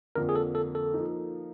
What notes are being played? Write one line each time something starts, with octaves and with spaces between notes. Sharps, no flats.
F2 D3 F3 A#3 A#4
G#4
A4
A4
A4
F3 A#3 D#4